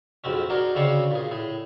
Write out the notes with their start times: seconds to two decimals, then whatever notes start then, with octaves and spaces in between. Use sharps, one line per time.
0.24 B1 F2 G#2 C4 C#4
0.50 D#4 F#4 G#4 A#4 D5
0.75 D2 C#3 C4 C#5 D5 C6
1.11 A#2 G#4
1.31 A2 G#4